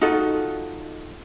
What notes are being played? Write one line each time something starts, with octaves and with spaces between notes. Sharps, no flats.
D#4 F4 F#4 A4